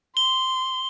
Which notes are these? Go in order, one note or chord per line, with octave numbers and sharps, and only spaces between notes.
C6 G7